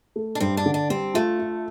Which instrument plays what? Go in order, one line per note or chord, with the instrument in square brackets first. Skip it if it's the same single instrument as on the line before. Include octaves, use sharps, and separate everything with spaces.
[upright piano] A3
[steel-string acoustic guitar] D4
[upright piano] G2 [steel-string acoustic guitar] C4
[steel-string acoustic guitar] D4
[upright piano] D3
[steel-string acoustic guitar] D4
[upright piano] G3 [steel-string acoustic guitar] C4
[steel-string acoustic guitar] A3 [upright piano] F4
[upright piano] F4